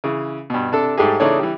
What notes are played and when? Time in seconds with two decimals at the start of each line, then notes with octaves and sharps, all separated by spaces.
0.04 C#3 E3
0.50 G2 B2
0.72 C3 D4 A4
0.97 G#2 G3 A3 G4 G#4
1.20 C#3 E3 A3 D4 D#4 C#5
1.39 E3 G3